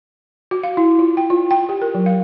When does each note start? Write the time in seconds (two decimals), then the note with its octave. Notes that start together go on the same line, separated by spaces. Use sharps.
0.51 F#4
0.63 F5
0.77 E4
0.99 F4
1.17 G5
1.30 F4
1.51 G5
1.69 G4
1.82 A#4
1.95 F#3
2.06 F5